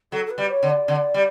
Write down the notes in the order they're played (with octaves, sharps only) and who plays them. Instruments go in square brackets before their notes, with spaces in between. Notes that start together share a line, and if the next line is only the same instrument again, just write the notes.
[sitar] F#3 [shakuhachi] A4
[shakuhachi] A4
B4
[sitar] G3
[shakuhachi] C#5
[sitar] D3
[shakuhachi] D5
[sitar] D3
G3